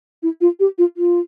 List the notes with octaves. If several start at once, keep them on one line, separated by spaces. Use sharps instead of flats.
E4
F4
G4
F4
F4